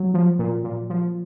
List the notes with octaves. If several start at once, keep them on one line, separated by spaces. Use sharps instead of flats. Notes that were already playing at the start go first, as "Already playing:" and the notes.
Already playing: F#3
F3
A#2
A#2
F3